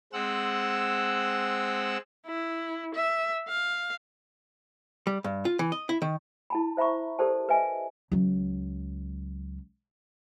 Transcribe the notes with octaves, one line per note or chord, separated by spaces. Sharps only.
G#3 C4 F#5 E6
E4
E5
F5
G3
G2
F4
E3
D#5
E4
D#3
E4 A5 B5
C5 E5 A#5 B5 C#6
G4 A4 A#4 C5 D5 A5
B4 D#5 E5 G#5
C#2 F#3